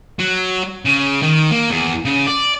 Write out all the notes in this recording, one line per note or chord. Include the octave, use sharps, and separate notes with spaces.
F#3
C#3
D#3
A#3
E2
C#3
D5